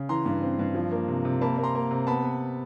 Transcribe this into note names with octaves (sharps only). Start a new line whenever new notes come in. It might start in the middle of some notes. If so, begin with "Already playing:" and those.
Already playing: C#3
E3 A#5 C6
G2
C4
G2
F3
A#3
C3
C3
A#3 A5 B5
A#3
A#5 C6
A#3
C3
B3 A5 B5
B3